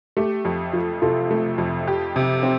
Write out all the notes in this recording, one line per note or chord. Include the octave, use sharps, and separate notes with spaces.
A3 G4
F2
F3
C3 F4 A4
A3
F2
G4
C3
C4